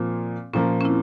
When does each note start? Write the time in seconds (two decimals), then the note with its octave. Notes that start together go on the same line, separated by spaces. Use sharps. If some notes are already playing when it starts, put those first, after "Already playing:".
Already playing: A#2 F3 A#3 C4
0.53 A#2 F3 A#3 C#4
0.80 C#4
0.85 C4 E4